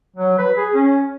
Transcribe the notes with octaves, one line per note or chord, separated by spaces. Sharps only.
F#3
B4
G#4
C#4